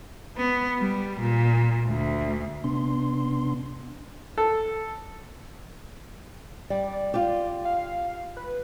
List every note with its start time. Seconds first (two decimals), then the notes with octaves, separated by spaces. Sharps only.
0.37 B3
0.79 G3
1.20 A#2
1.87 D2
2.64 C3 B3 D4 C6
4.38 A4
6.70 G3 D5
6.93 D5
7.14 F4 G4
7.65 F5
8.37 B4